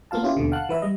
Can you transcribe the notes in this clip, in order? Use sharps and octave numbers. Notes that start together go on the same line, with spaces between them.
A#3 B3 F4 F5 A5
C#4 E4 F4 G4
D#2 B2 D3
F5 F#5 A5 F#6
E3 B4 E5
G3 D#5